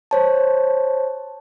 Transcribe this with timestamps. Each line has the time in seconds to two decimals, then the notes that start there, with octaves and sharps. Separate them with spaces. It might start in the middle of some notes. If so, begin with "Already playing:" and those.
0.11 C5 C#5 A5